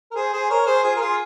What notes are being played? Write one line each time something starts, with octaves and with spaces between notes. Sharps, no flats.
A#4
G#4 C5
G#4 C5
A#4 C#5
G#4 C5
F4 G#4
A#4
F4 G#4